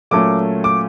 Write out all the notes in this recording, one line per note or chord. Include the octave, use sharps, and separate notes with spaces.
A#2 F#3 A3 C#4 D6
D6